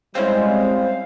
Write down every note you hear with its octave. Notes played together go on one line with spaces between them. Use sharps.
G3 G#3 C4 C#4 E4 C5 F5